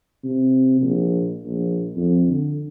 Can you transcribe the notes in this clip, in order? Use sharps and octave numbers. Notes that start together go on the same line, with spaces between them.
C3
A#1
A#1
F2
D3